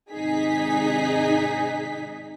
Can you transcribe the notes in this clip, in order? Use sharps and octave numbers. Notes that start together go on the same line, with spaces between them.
G#1 C3 D#4 G#4 B6